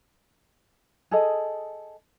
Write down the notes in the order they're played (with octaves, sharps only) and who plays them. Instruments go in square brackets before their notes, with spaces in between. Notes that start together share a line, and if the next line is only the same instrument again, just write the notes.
[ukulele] G#4 A4 D#5